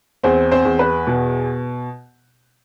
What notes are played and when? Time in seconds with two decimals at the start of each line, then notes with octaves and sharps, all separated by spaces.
0.23 E2 C4 C5
0.51 C4 C5
0.65 E2
0.79 B4
1.07 B2